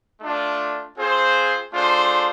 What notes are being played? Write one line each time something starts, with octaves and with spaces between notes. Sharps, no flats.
A3 D4 F4
C4 F4 G#4 C5
A3 D4 F4 G#4 C5